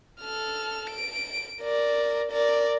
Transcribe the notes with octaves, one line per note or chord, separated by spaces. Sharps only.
A4 F6
D7
A#4 D5
A#4 D5